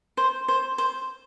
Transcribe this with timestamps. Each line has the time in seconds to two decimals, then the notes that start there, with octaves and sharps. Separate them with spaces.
0.17 C5
0.48 C5
0.78 C5